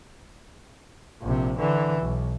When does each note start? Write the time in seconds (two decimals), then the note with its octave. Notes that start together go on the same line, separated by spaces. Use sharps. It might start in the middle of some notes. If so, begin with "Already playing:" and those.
1.22 A#1 C3
1.59 D3 E3
2.01 B1